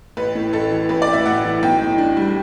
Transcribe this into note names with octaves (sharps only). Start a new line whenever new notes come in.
A1 B4
A2
A1 A4
E3
A1 B4
D5
A2
E5
A1 F#5
E3
B1 G5
A2
D4
G3